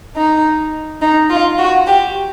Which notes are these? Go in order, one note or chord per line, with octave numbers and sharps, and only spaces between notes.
D#4
D#4
F4
F#4
G4